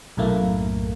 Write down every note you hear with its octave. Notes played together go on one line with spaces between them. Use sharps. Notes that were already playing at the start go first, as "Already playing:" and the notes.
B1 F#2 A2 A3 A#3